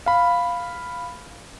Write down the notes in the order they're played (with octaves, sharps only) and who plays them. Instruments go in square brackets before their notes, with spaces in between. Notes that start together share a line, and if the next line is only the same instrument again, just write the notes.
[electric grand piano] F5 B5